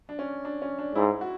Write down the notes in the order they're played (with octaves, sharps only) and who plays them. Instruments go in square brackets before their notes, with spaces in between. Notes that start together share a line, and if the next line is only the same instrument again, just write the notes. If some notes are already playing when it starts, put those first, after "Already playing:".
[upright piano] D4
C#4
D4
C#4
D4
[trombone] G#2 [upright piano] E4
[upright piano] F#4